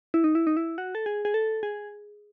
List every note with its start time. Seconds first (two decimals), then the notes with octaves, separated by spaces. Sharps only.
0.14 E4
0.24 D#4
0.35 E4
0.47 D#4
0.57 E4
0.78 F#4
0.95 A4
1.06 G#4
1.25 G#4
1.34 A4
1.63 G#4